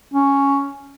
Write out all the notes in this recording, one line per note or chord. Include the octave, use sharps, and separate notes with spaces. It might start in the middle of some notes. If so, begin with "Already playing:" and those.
C#4